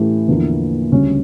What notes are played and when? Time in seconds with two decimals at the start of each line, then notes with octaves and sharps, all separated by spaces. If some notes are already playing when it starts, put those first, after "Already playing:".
Already playing: A2 E3 A3 C#4 G4
0.28 E2 D3 F3 A#3 E4
0.92 D2 C#3 G3 C#4